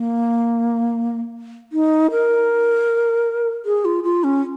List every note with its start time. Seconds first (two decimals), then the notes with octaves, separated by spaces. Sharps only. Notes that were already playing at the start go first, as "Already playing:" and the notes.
Already playing: A#3
1.72 D#4
2.11 A#4
3.65 G#4
3.85 F4
4.04 F4
4.24 C#4